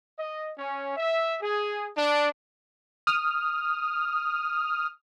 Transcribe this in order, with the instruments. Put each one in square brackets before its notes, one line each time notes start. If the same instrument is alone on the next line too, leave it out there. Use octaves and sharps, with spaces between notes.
[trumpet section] D#5
C#4
E5
G#4
D4
[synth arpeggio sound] D#6 F6